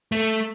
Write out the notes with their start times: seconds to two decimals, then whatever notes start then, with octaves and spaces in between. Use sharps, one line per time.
0.12 A3